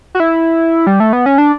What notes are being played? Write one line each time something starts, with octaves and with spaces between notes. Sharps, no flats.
F#4
E4
G3
A3
B3
C#4
D4